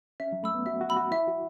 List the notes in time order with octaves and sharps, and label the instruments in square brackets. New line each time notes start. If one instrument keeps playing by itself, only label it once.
[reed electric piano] C#4 [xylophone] E5
[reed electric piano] F#3
[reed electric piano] A3 [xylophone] B5 E6
[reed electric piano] B3
[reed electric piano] F#4 [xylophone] E5
[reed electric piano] F#4
[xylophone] B5 E6
[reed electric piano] F#4
[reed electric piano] E4 [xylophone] E5
[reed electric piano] F#4